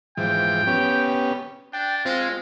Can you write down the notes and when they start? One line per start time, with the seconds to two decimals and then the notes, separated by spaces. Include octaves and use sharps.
0.17 G#2 E3 F3 G5
0.67 B3 C#4 G4
1.73 D4 G5
2.05 G#3 C4 F4